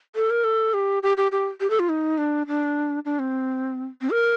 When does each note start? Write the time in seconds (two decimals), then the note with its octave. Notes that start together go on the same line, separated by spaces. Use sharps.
0.16 A4
0.30 A#4
0.44 A4
0.74 G4
1.03 G4
1.17 G4
1.32 G4
1.60 G4
1.70 A4
1.79 F4
1.89 D#4
2.18 D4
2.47 D4
3.05 D4
3.19 C4
4.01 C4
4.10 A#4